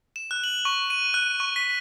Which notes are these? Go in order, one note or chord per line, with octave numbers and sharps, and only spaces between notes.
E7
F#6
F#7
C#6
D#7
F#6
C#6
B6